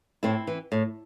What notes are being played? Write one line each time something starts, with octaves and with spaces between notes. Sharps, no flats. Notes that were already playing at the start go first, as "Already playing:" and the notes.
A2 C4 E4
E3
A2